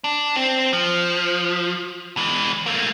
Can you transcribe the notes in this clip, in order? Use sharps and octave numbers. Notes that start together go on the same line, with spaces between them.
D4
C4
F3
E3 G#3
A3 A#3